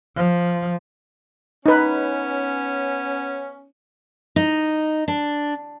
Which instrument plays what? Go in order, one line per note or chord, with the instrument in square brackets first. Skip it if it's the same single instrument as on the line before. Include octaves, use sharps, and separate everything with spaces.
[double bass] F3
[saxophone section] B3 C#4 [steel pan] D#4 B4
[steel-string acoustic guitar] D#4
D4